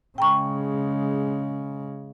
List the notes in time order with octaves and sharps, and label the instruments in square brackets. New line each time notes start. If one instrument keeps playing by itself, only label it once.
[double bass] C#3 G#3 [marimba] G5 A#5 C#6